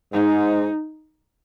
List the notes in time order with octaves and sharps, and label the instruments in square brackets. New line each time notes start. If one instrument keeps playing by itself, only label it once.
[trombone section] G#2 [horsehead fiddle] D#4